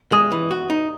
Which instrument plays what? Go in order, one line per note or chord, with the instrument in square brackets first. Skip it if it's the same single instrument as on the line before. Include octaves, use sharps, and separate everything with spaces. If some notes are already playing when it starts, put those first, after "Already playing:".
[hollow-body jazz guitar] G#3 [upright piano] D#6
[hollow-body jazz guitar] E3
F#4
D#4